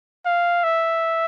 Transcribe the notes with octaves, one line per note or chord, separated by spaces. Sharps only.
F5
E5